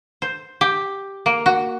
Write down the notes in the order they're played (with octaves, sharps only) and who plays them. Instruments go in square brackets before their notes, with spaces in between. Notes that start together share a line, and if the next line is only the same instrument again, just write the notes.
[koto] C5
G4
A#3
F#4